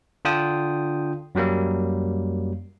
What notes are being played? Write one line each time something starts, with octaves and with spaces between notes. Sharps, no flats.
D3 D4 F4 G5 D#6
F#2 F#3 G3 A#3